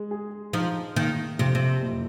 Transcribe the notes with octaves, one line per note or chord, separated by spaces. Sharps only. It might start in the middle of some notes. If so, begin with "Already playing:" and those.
Already playing: G#3
G#4
F3 D#4
A#2 D#3
F2 C3
C3
F#1